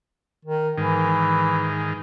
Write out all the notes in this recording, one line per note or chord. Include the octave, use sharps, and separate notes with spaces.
D#3
G#2 D#3 E3